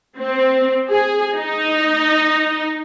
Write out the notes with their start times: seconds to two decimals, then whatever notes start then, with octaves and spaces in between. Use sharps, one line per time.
0.18 C4
0.90 G#4
1.36 D#4